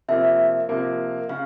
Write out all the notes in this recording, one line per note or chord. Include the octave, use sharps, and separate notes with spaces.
C3 F3 A#3 E5
C3 F3 A#3
C#3 F5